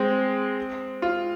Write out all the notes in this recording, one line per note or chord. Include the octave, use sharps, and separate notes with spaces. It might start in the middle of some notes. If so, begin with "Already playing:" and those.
Already playing: G#3 C4
F4